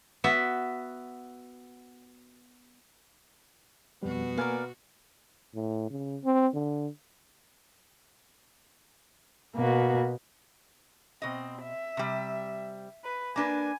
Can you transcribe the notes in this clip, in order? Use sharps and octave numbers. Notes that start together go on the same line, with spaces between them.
B3 F#4 E5
F2 B2 G3 B3 F#4
A#3 A#4 B4 D5 F5 G#5
A2
C#3
C4
D3
B2 A#3 F#4
B2 C4 D#5
E5
C3 G3
B4
A#3 D4 B4 G#5